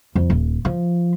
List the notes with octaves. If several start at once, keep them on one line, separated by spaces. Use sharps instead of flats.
F2
D#1
F3